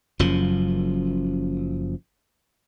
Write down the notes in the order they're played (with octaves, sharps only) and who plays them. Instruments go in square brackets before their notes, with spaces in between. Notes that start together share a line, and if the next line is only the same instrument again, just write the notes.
[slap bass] F#1 F#2 F3